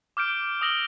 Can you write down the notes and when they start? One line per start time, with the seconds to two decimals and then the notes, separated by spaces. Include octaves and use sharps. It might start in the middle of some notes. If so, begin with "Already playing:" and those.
0.17 D6 F6 G6 D7
0.61 D#6 E6 A#6 F#7 G7